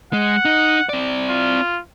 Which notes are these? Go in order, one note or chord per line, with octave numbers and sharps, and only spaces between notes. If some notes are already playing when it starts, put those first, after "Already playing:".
G#3 F#5
D#4
C4 D5
F4